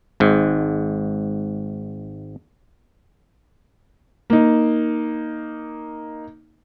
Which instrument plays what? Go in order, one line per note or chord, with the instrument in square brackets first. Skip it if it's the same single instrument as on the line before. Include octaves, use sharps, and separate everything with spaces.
[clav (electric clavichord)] G#1 G#2
[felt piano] A#3 D#4